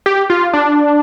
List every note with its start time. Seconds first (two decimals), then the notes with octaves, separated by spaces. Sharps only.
0.06 G4
0.30 F4
0.53 D4